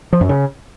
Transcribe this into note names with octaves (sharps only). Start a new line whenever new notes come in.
F3
F#2
C#3